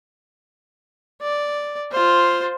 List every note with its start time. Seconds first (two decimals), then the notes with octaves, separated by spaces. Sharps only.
1.21 D5
1.91 F4 C5